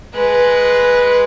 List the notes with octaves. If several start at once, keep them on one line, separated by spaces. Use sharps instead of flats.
G#3 B4